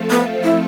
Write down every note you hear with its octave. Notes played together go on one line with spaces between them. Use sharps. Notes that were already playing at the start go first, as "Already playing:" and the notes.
Already playing: F3 A3 C4 F4 A4
B3
E4